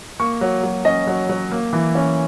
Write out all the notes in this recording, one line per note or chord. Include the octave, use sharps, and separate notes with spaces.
A#3 C#6
F#3
F#3
C#4 D#5
F#3
F#3
A#3
E3
C#4